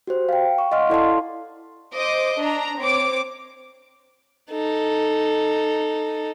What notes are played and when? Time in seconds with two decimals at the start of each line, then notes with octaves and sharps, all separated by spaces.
0.07 F#4 G4 C5
0.29 F5 G5
0.58 C#6
0.72 D#5 F5 F#5 C6 C#6 F6
0.90 E4 A4 D5 F5 A5 C6
1.94 C5 D#5 D6
2.41 D4 A#5
2.79 C4 C#5 D6
4.51 D#4 A4